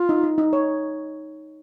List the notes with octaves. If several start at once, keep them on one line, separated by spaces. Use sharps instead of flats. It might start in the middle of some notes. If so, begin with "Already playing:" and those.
Already playing: F4
D#4
D#4
D#4
C#5